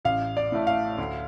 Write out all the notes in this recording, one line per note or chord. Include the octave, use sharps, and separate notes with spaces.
A1 F5
D5
A2 A3
F5
D2